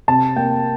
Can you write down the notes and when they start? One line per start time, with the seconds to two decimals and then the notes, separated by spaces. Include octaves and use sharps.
0.08 C3 A5
0.36 A#3 G5